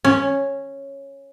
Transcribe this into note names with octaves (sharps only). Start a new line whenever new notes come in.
C#4